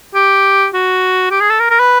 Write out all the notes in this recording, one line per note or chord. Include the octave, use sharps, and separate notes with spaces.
G4
F#4
G4
G#4
A4
A#4
A#4
B4